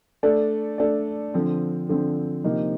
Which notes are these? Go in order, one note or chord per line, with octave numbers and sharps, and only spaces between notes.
A3 D4 A4 D5
A3 D4 A4 D5
D3 F3 C4
D3 F3 C4
C3 F3 A#3 D#4